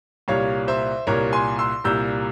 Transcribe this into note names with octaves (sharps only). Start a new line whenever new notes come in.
C2 A#2 G3 C#5 F5
C5 E5
C2 A#2 G3 A#4 C#5
G#5 C6
C6 E6
C2 A#2 G3 E6 G6